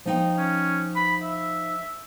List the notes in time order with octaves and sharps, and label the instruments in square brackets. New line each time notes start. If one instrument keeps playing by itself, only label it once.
[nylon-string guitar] F3 D#4 G5
[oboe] C#4
B5
E5